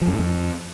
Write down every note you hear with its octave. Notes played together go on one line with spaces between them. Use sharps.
F3
F#2
A2
F2